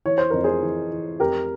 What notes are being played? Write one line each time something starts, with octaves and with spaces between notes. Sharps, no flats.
E3 C#5
C5
F2 A#4
G#4 C5
E3
E3
F2 G4 A#4